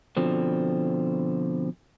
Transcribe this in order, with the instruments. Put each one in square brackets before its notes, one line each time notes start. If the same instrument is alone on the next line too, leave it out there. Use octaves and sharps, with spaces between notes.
[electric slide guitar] B2 D3 F3 C4